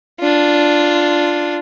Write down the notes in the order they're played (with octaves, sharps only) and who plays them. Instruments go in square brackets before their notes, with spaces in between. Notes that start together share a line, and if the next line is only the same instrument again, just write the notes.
[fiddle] D4 F4